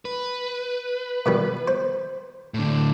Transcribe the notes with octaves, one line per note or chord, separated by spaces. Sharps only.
B4
B2 D#3 G3
C5
A2 D3